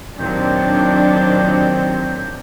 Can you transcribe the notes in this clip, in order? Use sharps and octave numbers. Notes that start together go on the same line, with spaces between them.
D#2 A#2 D#3 F#3 C4 D4 G6